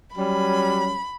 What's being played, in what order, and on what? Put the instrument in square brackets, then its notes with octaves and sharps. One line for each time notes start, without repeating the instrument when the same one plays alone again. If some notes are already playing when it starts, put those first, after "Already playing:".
[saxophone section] F#3 G3 C#4 [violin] B5